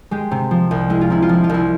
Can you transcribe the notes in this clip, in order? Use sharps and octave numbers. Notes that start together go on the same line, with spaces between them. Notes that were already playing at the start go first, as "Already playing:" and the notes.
G#3 G4
C3
F3
C2
G#3 E4
F4
C3 E4
F4
F3 E4
F4
C2 E4